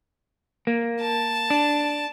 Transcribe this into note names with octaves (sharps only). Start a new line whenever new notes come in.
A#3
A5
D4